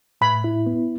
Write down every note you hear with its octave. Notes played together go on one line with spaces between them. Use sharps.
A2 B5
E4
B3